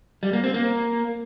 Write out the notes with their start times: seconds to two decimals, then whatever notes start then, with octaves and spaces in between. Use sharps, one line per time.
0.23 G3
0.33 A#3
0.44 C4
0.54 A#3